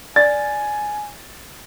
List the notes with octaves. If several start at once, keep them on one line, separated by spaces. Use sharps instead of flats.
D5 G#5 A6